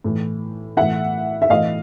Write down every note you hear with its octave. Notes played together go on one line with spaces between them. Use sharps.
A2 E3
A2 E3 E5 F#5
E5
A2 E3 D#5 F5